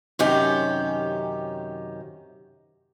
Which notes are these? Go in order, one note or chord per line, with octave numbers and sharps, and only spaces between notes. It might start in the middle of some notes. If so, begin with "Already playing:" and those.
F#2 C3 D#3 C#4 G4